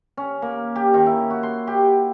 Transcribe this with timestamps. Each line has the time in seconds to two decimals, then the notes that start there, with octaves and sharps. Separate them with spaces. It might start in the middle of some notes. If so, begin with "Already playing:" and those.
0.17 C#4
0.42 A#3
0.76 G4
0.94 D#3
1.06 E4
1.30 F#4
1.43 C6
1.67 G4